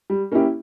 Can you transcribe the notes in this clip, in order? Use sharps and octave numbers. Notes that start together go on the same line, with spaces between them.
G3
A#3 C#4 E4 G4